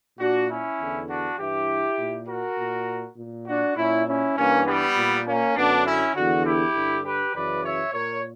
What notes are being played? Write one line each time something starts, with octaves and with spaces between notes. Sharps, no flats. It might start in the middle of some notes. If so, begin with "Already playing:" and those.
A#2 D4 F#4
C#4 E4
E2 D3
D4 F#4
G2 E3 E4 G4
A#2
F#4 A#4
A#2
A#2
D4 F#4
A#2 C#4 E4
C#4 E4
G2 E3 A#3 C#4
G3 B3
A#2
A#3 C#4
F#2 D3 B3 D4
C#4 E4
E2 D3 D4 F#4
E4 G4
G2 D3
G4 B4
F#2 C#3 E3 B4 D5
C#5 E5
A#2 A#4 C#5